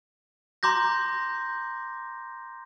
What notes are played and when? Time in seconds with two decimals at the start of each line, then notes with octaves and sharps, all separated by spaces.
0.63 A#5 C6 D6 G6 A#6